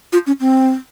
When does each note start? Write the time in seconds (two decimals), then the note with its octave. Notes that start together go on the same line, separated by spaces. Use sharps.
0.13 F4
0.27 C#4
0.41 C4